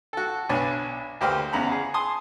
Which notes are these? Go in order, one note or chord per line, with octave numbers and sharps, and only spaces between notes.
F#4 A4
B1 D4 B4 C#5 G#5
D2 A#3 G4 B4 C5 F6
E2 C#3 F#5 A#5 B5
G#4
G#5 A5 C6 D#6